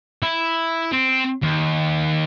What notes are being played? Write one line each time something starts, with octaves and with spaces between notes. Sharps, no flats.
E4
C4
D#2